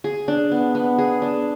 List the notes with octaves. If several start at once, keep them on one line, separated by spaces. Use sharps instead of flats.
G#4
D4
B3
B3
G#4
D4